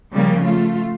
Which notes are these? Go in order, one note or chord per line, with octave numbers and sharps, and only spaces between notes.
C#3 F3 G3 A#3
A3 F4